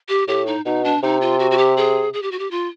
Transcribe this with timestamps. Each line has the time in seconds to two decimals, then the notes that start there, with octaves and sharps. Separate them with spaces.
0.09 G4
0.27 A2 G4
0.47 D#4
0.65 B2 D#4
0.84 D4
1.03 C3 D#4
1.21 F4
1.39 F#4
1.51 F#4
1.58 G4
1.77 G#4
2.13 G#4
2.22 G4
2.32 F#4
2.39 G4
2.51 F4